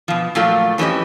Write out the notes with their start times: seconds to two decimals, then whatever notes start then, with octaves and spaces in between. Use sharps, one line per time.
0.08 B2 F3
0.35 A#2 F3 F#3 A3 F4
0.78 F2 E3 C#4 G4 D#5